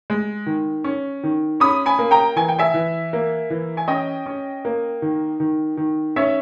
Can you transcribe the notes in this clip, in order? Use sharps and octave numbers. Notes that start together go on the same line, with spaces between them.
G#3
D#3
C#4
D#3
C#4 B5 D#6
G#5 B5
A#3
G5 A#5
E3 G#5
G5
E5 G#5
E3
A#3
E3
G#5
C#4 D#5 G5
C#4
A#3
D#3
D#3
D#3
C#4 C#5 E5